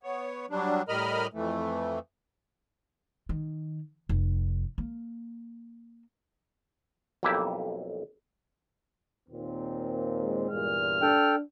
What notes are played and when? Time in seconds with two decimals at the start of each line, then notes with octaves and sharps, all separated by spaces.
0.03 B3 C#5
0.50 F#3 G3 D4
0.89 A2 G3 A#4 D#5 B5 F6
1.33 F2 E3 A3
3.29 D#3
4.09 F1
4.78 A#3
7.23 B1 F2 A#3 E4 G4 E5
9.29 D#2 A#2 C4
10.21 G#3
10.51 E2 G2 A#2 F6
11.02 D4 A4 G5